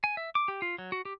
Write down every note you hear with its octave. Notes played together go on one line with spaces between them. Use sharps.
G#5
E5
D6
G4
F4
F#3
F#4
G4